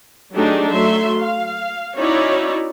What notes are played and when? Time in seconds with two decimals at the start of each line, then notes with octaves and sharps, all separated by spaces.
0.32 F#3 A3 D4 D#4 G4 G#4
0.71 F#3 A3 E5 C6
1.22 F5
1.96 C#4 D#4 E4 F#4 C#5 D5